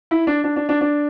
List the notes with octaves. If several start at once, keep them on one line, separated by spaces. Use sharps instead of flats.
E4
D4
D4
D4
D4
D4